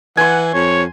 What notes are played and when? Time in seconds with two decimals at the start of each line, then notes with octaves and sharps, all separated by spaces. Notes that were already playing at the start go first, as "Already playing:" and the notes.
0.17 E3 F#5 G#5 C6
0.54 F2 C#5